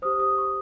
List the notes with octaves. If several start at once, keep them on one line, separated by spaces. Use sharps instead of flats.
G4 C5 D#6
D#6
C#6